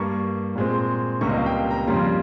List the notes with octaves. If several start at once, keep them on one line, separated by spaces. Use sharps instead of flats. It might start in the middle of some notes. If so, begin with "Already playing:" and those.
Already playing: G2 G3 A#3 C#6
A#2 G#3 C4
C#2 C3 G3 A#3 C#6
D#5
F5
G5
A#5
F2 C#3 G3 A#3 C6